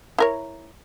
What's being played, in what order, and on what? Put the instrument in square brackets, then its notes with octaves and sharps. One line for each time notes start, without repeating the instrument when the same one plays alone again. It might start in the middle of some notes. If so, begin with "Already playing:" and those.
[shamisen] E4 A#4 C#5